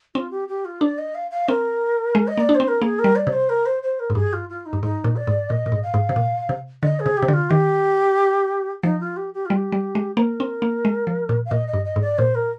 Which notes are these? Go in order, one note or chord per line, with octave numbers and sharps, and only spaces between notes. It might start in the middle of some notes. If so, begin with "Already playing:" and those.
C4 F4
G4
G4
F4
D4 D5
D#5
F5
F5
C4 A#4
G#3
D#5
A#3
D5
D4
C5
C4
A#4
A#3 G#4
A#4
G3
D5
C3
C5
A#4
C5
C5
A#4
G#2
G2 G#4
F4
F4
D#4
G2
G#2 D#4
A#2
D5
G#2
A#2 D#5
A#2
G#2
F5
G#2
C3
A#2
C3
D3 D#5
G#4
C3
G4
C3
D3
F4
D#3 G4
F3 D#4
F4
G4
G4
G3 F4
G4
G3
G#3
A#3 C5
A#4
C4
A#3
G#3
F3
A#2
F5
A#2 D#5
D#5
G2
D#5
G#2
D5
A#2 C5
A#4